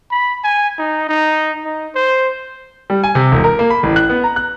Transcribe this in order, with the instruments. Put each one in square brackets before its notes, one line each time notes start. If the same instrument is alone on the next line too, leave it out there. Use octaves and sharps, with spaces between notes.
[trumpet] B5
G#5
D#4
D#4
D#4
C5
[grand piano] G3
G#5
C3
E1
A#4
A#3
B5
A1
F#6
B3
A#5
F#6